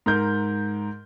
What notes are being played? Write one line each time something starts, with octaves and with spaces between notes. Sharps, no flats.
G#2 A#4 G6